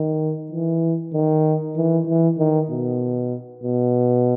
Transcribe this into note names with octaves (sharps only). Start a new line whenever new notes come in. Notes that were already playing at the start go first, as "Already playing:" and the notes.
Already playing: D#3
E3
D#3
E3
E3
D#3
B2
B2